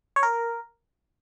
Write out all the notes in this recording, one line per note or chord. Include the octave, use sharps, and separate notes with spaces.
C#5
A#4